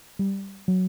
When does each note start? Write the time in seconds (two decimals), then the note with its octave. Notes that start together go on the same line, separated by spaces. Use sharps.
0.19 G3
0.68 F#3